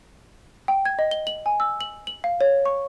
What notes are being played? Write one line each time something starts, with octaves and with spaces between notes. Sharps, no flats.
G5
G#6
D#5
G7
F#7
G#5
E6
F#7
F#7
F5
C#5
C#6